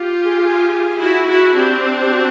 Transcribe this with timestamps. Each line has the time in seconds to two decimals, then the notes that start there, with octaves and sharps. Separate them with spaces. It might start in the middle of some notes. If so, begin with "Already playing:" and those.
Already playing: F4 G4
0.24 G#4
0.43 G#4
0.99 E4 F#4
1.27 E4 F#4
1.55 C4 D4 G4
2.01 G4
2.12 F#4